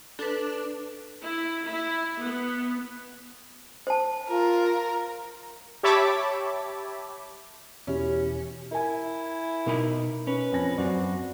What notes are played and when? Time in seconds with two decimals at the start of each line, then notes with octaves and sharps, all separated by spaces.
0.19 D4 A4 B4
1.23 E4
1.66 E4
2.21 B3
3.87 C5 A5
4.29 F4 A#4
5.83 G4 C#5 E5 A5 B5 D6
7.87 E2 B2 C#4 E4 G4
8.72 E4 A#4 G#5
9.66 B2 D#4 A#4 B5
10.27 C#4 B4
10.52 F2 G#5 A#6
10.78 F#2 C4 F#4 D5